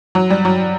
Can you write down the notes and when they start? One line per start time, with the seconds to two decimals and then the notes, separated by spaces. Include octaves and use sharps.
0.15 F#3
0.30 G3
0.45 F#3